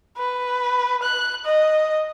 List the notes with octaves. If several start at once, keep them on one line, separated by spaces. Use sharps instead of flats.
B4
F#6
D#5